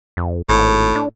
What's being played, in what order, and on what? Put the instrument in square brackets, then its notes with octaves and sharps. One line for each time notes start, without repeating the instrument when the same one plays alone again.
[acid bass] F2
[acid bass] G#1 [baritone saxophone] A2
[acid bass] D4